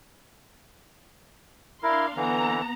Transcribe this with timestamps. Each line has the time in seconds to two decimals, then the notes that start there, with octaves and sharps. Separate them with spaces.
1.83 D4 E4 A#4 F5 C6
2.16 D3 E3 B3 A#5